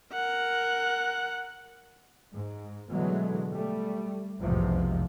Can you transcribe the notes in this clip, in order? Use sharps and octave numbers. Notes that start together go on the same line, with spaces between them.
A#4 F#5
G#2
B2 D3 E3 F#3 G#3 A3
G3 A3
F1 B1 E2 G#2 C3 F3